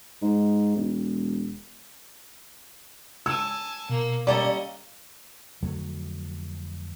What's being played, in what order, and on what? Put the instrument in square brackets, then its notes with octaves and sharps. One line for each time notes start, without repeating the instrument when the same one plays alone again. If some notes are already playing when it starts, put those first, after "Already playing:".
[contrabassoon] G#2
E1
[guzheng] C#5 [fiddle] G#5 A5 [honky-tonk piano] E6
[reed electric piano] B2 [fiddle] A#3
[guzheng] G3 A#3 A4 [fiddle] C#4 D#5 [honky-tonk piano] D5
[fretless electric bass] F2 D3 F#3 A3